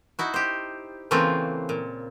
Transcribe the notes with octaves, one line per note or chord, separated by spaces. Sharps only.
D#4 E4 F#4
G4 C5
C#3 E3 A3 A#3 C4 F4
A#2